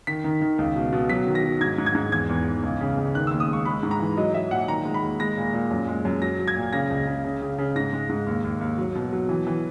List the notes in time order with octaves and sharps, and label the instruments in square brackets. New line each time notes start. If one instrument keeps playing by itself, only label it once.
[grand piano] D#3 B6
D#3
D#3
C#2
B2
B2
F#3 B6
D#3
A#6
F#3
G#2 G#6
G#2
G#6
G#2
E2 G#6
E2
E2
C#2
C#3
C#2
D#3 F#6
D#2 E6
D#6
G#3 C#6
G#3 B5
G#2
A#5
E3
F#3 D#5
F#3 E5
A#2 F#5
D#3 A#5
G#3
B5
D#2
G#3 A#6
A#2
A#2
F#2
G#3
F#2
F#3 A#6
F#3
G#6
A#2
C#3 A#6
C#2
C#3
C#3
C#3
C#3
G#2 A#6
G#3
G#2
D#2
D#2
D#2
F#3
B2
F#3
E3
E3